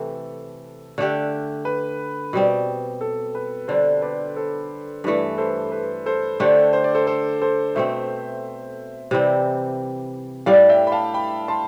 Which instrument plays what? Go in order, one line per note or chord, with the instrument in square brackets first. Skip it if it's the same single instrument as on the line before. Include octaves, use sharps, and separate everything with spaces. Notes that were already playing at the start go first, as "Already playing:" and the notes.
Already playing: [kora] C3 E3 A3 C4 [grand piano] A4
[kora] D3 A3 D4 G4
[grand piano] B4
[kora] B2 G3 C4
[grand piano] A4
B4
[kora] D3 G3 D4 [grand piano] A4 C5
[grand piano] B4 D5
A4 C5
[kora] G2 E3 A3 [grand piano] B4 D5
[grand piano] A4 C5
B4
A4 C5
[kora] D3 A3 D4 G4 [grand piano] A4 C5
[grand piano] C5
D5
A4 C5
A4 C5
A4 C5
[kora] B2 A3 C4 [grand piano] C5 E5
[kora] C3 E3 G3 C4
[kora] A2 G3 D4 [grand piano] D5 F5
[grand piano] E5 G5
B5
F5 A5
G5 B5
A5 C6